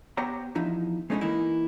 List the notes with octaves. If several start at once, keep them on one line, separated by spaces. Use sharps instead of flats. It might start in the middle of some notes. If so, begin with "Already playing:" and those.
B3 G4 C5 C#5 G5 A#5
E2 F3 D#4 E4
G#3 A3 C#4 D#4 E4 G#4
E3 A#3 D#4 E4